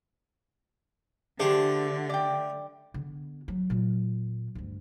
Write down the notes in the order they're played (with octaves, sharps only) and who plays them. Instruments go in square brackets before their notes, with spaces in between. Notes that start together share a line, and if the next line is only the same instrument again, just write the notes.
[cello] D3 [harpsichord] A3 G4 [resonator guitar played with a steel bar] D4 G#4 C5
[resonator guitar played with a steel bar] D5 G5
[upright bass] D3 B3
F#3
A#2 F#3
D2 G2